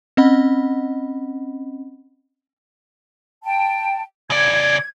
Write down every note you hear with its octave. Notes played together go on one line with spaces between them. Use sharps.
C4 C#4 D#5 F#5 B5
G5 A5
C#3 D5 G#6